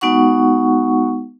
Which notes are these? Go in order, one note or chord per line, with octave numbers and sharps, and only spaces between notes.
G#3 B3 D#4 F#4 F#5 C#6